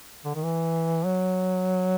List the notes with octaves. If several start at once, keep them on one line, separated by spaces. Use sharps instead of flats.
D3
D#3
E3
F#3